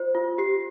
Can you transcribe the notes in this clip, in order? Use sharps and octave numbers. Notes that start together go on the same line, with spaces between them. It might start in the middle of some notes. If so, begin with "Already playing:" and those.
Already playing: F4 C5
F4
G4 C7